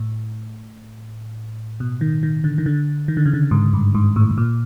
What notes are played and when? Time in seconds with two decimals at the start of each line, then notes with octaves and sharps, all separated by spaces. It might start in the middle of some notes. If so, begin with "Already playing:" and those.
Already playing: A2
1.80 B2
2.01 D#3
2.23 D#3
2.44 D3
2.58 D#3
2.66 D3
3.08 D#3
3.17 D3
3.26 C#3
3.33 D3
3.51 G#2
3.73 G2
3.95 G#2
4.16 A2
4.31 A2
4.38 A#2